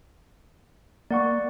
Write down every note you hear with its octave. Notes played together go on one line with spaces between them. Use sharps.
A#3 D5 F#5 C#6